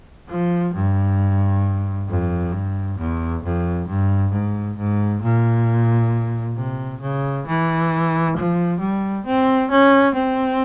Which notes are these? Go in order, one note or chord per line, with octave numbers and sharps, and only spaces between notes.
F3
G2
F2
G2
E2
F2
G2
G#2
G#2
A#2
C3
C#3
E3
F3
G3
C4
C#4
C4